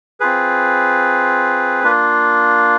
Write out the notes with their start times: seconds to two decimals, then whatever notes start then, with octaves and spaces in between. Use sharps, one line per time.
0.20 C4 F4 G#4 B4
1.84 A#3 D4 F4